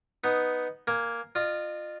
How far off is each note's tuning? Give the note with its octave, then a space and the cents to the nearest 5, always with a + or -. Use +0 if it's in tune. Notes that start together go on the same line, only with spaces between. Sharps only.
B3 +0 D#4 +0
A#3 +0 G#5 -5
F4 +0 D#5 -40